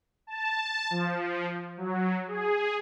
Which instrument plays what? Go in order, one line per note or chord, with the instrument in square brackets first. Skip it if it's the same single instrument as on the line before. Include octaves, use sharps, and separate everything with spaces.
[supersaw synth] A5
F3
F#3
G#4